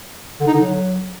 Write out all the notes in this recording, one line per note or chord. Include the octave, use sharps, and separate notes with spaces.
D3
D#4
D3
F#3